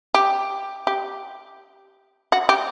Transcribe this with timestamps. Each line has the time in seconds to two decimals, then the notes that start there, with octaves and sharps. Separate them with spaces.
0.14 G4
0.87 G4
2.32 F#4
2.49 G4